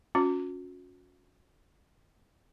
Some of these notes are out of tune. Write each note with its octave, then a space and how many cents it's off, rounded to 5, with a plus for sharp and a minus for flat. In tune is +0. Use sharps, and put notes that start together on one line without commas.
C#4 +10 F#4 -40